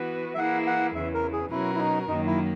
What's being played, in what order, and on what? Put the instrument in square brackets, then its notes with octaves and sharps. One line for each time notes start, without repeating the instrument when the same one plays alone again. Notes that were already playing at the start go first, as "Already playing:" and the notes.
Already playing: [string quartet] E3 B3 F#4 B4
[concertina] E5
[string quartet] E3 A#3 E4 G#4 [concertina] F#5
[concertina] F#5
[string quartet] E2 C#3 E3 [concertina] E5
[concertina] A#4
G#4
[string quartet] B2 F#3 C#4 F#4 A#4 [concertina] E4
[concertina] E4
D#4
[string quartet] F#2 D#3 F#3 A#3 [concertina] D#4
[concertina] E4